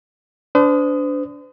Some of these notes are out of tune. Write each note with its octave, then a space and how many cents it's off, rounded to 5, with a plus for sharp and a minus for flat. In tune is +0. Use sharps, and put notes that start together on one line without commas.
D4 -20 C5 -45 D#6 +0